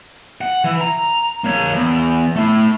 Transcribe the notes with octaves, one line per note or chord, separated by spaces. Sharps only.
F#5
E3
A#5
A#3 C#5
E2
A3 E4